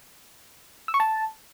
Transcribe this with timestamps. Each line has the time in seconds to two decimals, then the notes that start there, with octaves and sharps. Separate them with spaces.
0.88 E6
0.94 C#6
1.00 A5